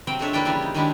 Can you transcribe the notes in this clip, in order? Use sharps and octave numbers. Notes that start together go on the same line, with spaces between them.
C3 F#3 C4 G5
F3 G#3 A3 D4 C#5 E5
A#3 E4 B4 D5 G5
C#3 E3 G3 E4 F4 G4
D#4
D#3 F#3 G#3 D4 E4 G4